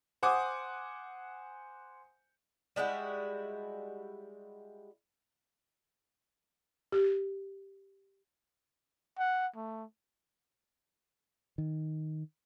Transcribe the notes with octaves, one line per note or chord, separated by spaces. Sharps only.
C5 F#5 G#5 D6 D#6
G3 G#3 E4 F#4
G4
F#5
A3
D#3